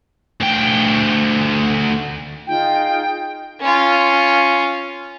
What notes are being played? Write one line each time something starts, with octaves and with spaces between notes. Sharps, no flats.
D2 G5
D#4 F4 G#4 G5
C#4 F4